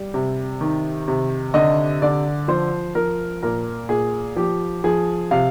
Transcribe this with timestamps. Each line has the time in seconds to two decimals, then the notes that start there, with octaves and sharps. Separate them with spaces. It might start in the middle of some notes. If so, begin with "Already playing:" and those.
Already playing: G3
0.14 C3
0.61 D#3
1.08 C3
1.54 D3 D#5
2.02 D3 D5
2.48 F3 C5
2.95 F3 A#4
3.43 A#2 A#4
3.89 A#2 G#4
4.36 F3 G4
4.84 F3 G#4
5.31 C3 F5